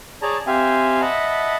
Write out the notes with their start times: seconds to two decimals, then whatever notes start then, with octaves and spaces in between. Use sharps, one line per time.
0.22 G#4 C#5 D5 A5 A#5
0.47 C4 G4 E5 F5 G#5
1.01 D#5 E5 F#5 A5 B5